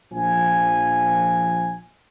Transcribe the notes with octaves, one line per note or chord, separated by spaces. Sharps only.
A#1 F3 G#5